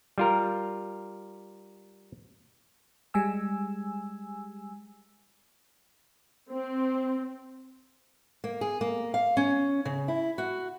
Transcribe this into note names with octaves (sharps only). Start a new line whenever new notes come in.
G3 F4 A#4
G3 G#3 G#5 E6
C4
A#3
G#4
A#3
F5
C#4
C#3
E4
F#4